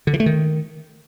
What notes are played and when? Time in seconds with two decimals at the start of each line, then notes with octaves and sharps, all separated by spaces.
0.07 D3
0.13 E3
0.20 A3
0.26 D#3